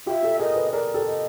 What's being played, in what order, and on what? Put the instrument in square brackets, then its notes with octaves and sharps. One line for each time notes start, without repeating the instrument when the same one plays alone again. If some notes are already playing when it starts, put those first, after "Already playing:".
[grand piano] F4 G4 [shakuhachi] E5
[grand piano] G4 A4
[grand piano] G#4 A#4 [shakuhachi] D#5
[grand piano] A4 B4
[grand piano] G#4 A#4 [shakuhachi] D5
[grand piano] G4 A4
[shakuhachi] D#5